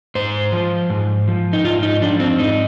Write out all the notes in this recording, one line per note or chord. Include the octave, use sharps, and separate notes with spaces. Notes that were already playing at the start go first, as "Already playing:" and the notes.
G#2 C5
F3
G#2
F3
D#4
G#2 F4
D#4
F3 D4
C4
G#2 D#4